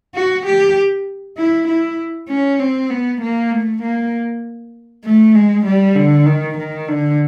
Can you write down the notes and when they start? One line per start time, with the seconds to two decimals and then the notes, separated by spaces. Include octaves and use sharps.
0.15 F#4
0.46 G4
1.38 E4
1.68 E4
2.29 C#4
2.59 C4
2.90 B3
3.21 A#3
3.51 A3
3.83 A#3
5.05 A3
5.35 G#3
5.66 G3
5.95 D3
6.26 D#3
6.57 D#3
6.88 D3